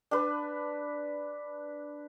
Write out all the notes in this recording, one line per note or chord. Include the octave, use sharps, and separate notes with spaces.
D4 B4